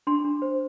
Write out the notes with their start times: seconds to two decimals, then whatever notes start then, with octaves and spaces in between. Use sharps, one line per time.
0.07 D4 C6
0.24 D4
0.42 C5